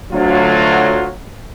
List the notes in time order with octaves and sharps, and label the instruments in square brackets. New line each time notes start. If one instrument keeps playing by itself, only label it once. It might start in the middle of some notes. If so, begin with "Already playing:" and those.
[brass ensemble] D2 F#3 F4